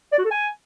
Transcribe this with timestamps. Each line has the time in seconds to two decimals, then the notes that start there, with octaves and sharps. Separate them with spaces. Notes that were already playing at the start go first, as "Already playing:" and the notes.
0.12 D5
0.19 F#4
0.25 A4
0.31 G#5